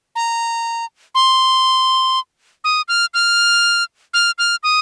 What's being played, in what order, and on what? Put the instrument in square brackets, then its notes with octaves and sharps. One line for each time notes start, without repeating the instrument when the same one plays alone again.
[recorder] A#5
C6
D#6
F6
F6
F6
F6
D#6